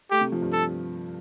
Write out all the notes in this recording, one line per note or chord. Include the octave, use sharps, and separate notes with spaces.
A3 G4
C3
F3
G2
A4